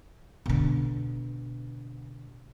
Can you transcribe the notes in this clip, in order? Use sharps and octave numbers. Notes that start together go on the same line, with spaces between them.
B2 D3